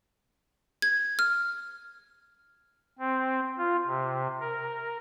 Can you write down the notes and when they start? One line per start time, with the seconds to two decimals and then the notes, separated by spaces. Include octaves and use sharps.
0.82 G#6
1.19 F6
2.99 C4
3.58 F4
3.87 C3
4.40 A#4